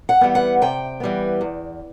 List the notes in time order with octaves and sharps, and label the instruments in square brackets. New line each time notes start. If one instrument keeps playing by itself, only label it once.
[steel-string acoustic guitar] F#5
E3 G3 B3
F#5
C3 G5
E3 G3 B3
E2